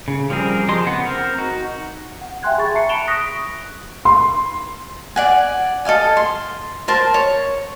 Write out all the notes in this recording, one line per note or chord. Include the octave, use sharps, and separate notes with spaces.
C#3
F3 G3 C4 G#4 A#4
F3 G4 G#4 D#5 C6
C#3 B3 C4 F#5
C4 A#4
D#4 F#4
F#5
E5 G5 G#5 C6 F#6 G#6
G#4 B5 C#6 A6
E5 A5 A#5 C7 C#7
B5 C#7 D7 E7 F7 G7
C#6 D#6 F#6 A#6 B6 D7
C6
D5 F#5 G#5
A4 D#5 F5 G#5
C6
A#4 C5 A5 C6
C#5